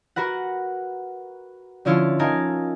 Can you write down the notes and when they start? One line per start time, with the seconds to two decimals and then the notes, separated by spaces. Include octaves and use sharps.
0.16 F#4 A#4 B4 F#5
1.85 D3 F3 C#4 E4 F4 C#5
2.19 D#4 A4 A#4 F5 G#5